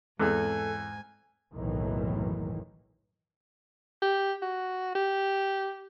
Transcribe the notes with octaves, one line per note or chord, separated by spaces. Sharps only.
E2 G#2 G#3 C4 G#4 A4 G#5
F#1 B1 A2 D#3 E3
G4
F#4
G4